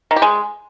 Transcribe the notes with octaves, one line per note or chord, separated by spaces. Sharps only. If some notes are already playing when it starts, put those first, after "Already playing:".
D#3
G4
G#3